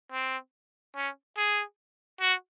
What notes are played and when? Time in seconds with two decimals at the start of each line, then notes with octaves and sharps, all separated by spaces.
0.12 C4
0.96 C#4
1.37 G#4
2.21 F#4